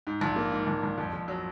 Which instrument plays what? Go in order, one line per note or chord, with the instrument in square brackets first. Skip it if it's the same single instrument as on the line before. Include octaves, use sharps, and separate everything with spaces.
[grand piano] G#2
A#1
A#3
G#2
A#1
A#1
F2
F2
F#3